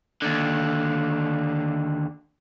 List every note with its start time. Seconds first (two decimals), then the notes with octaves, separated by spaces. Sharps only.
0.22 D#2 D3